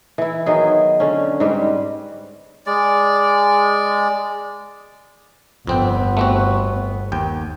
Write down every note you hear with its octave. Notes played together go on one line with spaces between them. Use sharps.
E3 E4
D#3 F#3 B3 G#4
D3 C#4
G#2 G3 B4
G#3 D5
G1 F2 B3 C4 G5
A3 C4 F#4
D#2 G5